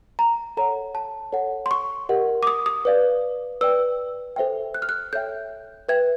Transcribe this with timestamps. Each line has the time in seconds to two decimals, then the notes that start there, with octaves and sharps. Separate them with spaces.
0.19 A#5
0.57 A4 C#5 F#5 A#5
0.95 A5
1.32 A4 C#5 F#5
1.66 C6
1.71 C#6
2.09 G4 A#4 D#5 F#5
2.43 D6
2.47 D#6
2.66 D#6
2.85 B4 D5 F5
3.61 B4 D5 G5 E6
4.36 A4 C5 E5 G5
4.74 F#6
4.82 F6
4.89 F#6
5.13 A4 C#5 E5 G5 G6
5.89 B4 E5 G5 G#6